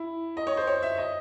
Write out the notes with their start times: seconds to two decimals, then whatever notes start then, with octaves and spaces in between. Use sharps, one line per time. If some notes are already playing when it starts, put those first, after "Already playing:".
Already playing: E4
0.37 D#5
0.47 C#5
0.57 C5
0.67 C#5
0.82 E5
0.98 D#5